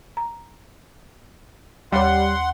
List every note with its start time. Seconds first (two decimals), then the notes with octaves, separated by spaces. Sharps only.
0.17 A#5
1.92 D#2 G3 C#5 F#5 C6